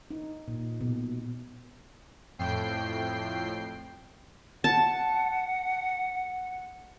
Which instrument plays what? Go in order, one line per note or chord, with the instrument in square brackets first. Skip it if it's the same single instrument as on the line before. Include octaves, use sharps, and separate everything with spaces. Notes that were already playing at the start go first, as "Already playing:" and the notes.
[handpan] D#4
A#2
B2
[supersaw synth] F2 A2 G5 C7
[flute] F#5 [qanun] A5